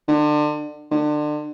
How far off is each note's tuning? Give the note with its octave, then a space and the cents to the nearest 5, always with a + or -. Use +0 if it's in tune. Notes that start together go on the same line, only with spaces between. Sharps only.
D3 +30
D3 +30